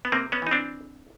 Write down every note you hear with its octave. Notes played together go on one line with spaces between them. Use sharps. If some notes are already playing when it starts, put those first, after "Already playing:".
B3
C3 A#3 C4
B3 C#4
E3 D#4
C4 D4